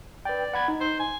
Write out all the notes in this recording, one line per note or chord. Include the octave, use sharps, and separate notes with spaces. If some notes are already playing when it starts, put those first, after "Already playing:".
B4 D5 G5
F#5 B5 G#6
D#4
C5
G#5